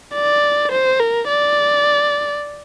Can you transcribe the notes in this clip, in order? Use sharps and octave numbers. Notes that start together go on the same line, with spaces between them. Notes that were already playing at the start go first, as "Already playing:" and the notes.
D5
C5
A#4
D5